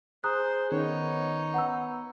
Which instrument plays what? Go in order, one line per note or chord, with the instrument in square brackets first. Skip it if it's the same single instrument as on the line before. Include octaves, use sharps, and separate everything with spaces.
[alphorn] G#4 [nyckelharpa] C5 [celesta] A#5 D#6 F#6
[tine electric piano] D#3 C#4 [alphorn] B3 [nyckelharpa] D#4 C#5
[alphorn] B3 [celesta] F#5 A#5 E6